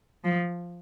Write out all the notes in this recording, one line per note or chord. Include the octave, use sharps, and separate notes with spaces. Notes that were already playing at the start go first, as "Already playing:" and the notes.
F3